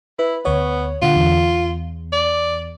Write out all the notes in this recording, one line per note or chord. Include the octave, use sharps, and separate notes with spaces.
E4 B4
D2 B3 C#5
A#2 D3 F4 F#5
E2
D5